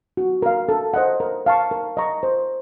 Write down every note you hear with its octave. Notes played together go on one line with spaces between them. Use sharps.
F#4
A#4 F5
A4
C5 D#5 F#5
A#4
F5 A5 C#6
A#4
D#5 A#5 C#6
C5